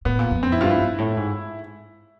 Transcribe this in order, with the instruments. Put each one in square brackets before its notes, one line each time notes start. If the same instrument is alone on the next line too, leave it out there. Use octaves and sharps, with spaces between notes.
[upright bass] A2 [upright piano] B3
[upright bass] A#2
F2
[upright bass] F2 [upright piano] C4
[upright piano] E4
[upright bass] G2 [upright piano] F4
[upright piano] E4
[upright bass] G2
A2
G#2